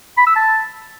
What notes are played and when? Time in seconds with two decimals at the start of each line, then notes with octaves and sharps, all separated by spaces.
0.17 B5
0.27 E6
0.36 A5